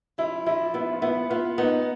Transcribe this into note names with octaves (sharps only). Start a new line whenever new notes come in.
F3 E4
F3 E4
B3 E4
F4
B3 E4
B3 F4
B3 D#4